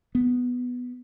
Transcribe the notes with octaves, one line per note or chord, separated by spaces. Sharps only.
B3